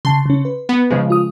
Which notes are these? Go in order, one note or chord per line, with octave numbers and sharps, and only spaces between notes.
C#3 A5 C6
C#3 C#4
B4
B3
C#3 F3 G#3
F4 D#6